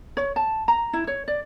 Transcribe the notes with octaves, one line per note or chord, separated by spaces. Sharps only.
C#5
A5
A#5
E4
C#5
D5